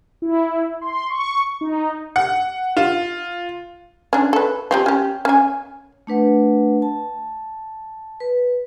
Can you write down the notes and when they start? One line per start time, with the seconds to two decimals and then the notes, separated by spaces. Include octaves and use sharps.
0.22 E4
0.81 C6
1.10 C#6
1.61 D#4
2.16 F#5
2.77 F4
4.13 C#4 D4
4.33 A4 B4
4.71 F3 C4 G4
4.86 C#4 G4
5.25 C#4 G#5
6.07 A3 D4 B4 F#5
6.82 A5
8.20 B4